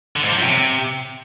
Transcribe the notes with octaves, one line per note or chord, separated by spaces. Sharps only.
D3
G#2
F3
F#2
C3